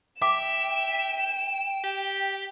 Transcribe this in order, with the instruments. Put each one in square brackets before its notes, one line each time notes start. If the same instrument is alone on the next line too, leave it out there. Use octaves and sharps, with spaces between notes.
[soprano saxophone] E5 [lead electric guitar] G5 [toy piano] D6 [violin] E7
[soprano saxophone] G4